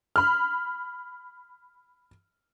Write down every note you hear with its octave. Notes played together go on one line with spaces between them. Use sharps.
B5 F6